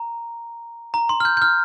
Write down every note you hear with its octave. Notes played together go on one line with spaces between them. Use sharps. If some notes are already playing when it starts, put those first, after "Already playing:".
Already playing: A#5
A#5
C6
F6
G6
G6
F6